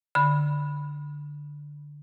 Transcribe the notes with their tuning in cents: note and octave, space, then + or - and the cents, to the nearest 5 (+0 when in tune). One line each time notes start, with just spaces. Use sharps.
D3 +0 B5 +0